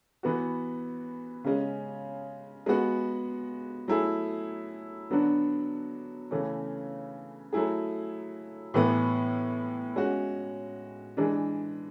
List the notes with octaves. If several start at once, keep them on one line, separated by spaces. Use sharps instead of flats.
E3 B3 F#4
C#3 G#3 C#4
G#3 B3 F#4
F#3 A3 E4 G#4
D3 F#3 B3 D4 F#4
C#3 E3 A3 C#4
F#3 A3 E4 G#4
A2 E3 B3
G#3 C#4 F#4
E3 G#3 D4